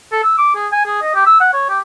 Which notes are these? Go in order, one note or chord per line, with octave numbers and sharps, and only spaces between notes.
A4
E6
D6
G#4
G#5
G#4
D#5
G4
E6
F#5
C#5
G4